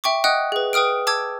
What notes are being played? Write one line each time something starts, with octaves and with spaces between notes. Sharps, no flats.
E5 G5 C#6 D6
D#5 F#5 G5 D#6 F#6
G#4 B4
B4 G5 D#6 F6 D7
A5 D6 E6 G#6